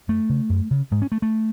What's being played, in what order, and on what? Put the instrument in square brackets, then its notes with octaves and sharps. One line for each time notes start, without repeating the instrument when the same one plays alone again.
[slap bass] F#2 A3
C#3
F#2
C#3
G#2 G#3
C#4
A3
A3